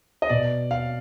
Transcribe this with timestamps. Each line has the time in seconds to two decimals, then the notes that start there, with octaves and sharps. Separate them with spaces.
0.22 D#5
0.29 B2 D5
0.71 F5